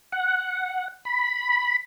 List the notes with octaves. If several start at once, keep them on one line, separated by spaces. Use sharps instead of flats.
F#5
B5